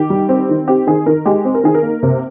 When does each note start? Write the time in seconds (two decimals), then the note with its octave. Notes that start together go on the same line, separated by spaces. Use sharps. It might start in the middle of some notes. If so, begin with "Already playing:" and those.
Already playing: D#3 G4
0.10 G3
0.29 C4
0.49 D#3
0.68 C4 G4
0.87 D#3 G#4
1.06 D#3 A#4
1.25 G#3 G4
1.45 C4
1.54 A#4
1.64 D#3 G#4
1.74 A#4
1.83 A#3
2.03 C3